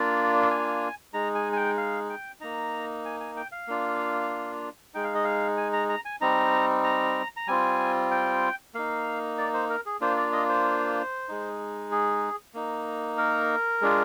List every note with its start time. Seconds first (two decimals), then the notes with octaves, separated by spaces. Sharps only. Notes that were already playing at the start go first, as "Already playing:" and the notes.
Already playing: A#3 D4 F4 D5
0.50 G#5
1.14 G#3 D#4 A#5
1.35 G#5
1.53 G#5
1.56 G5
1.77 F5
2.10 G5
2.40 A#3 D#4 A#5
3.05 G#5
3.20 G#5
3.36 G5
3.52 F5
3.68 A#3 D4 F4
4.94 G#3 D#4 G5
5.04 F5
5.15 D#5
5.24 F5
5.57 G#5
5.73 A#5
5.89 A#5
6.05 G#5
6.21 G3 C4 D#4 A#5
6.84 A#5
7.37 A#5
7.47 G3 C4 F4 G#5
8.11 G5
8.74 A#3 D#4 F5
9.38 D5
9.54 C5
9.70 A#4
9.86 G#4
10.01 A#3 D4 F4 C5
10.16 D5
10.33 D#5
10.49 C5
11.28 G#3 D#4
11.92 G#4
12.54 A#3 D#4
13.18 A#4
13.81 G#3 D4 F4